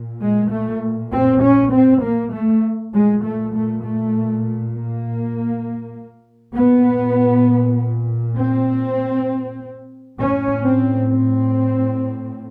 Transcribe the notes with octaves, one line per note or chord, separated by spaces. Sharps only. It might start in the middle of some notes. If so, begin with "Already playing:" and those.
Already playing: A#2
G#3
A3
C4
C#4
C4
A#3
A3
A#2 G#3
A3
A3
A3
A#3
A#2 B3
C4
A2 C#4
C4
C4